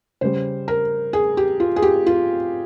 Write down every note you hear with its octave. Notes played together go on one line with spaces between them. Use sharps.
C#3 G3 C5
A#4
G#4
G4
F4
G#4
G4
F4